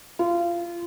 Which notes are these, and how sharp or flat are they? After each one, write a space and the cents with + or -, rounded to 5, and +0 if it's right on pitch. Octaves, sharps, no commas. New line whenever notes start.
F4 -25